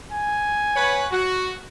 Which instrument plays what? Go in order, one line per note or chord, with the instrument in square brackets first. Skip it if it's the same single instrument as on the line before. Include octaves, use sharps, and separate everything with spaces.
[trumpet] G#5
[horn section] B4 C#5 F#5
F#4